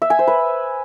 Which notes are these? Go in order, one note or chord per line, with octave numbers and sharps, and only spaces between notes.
E5
G#5
C5
B4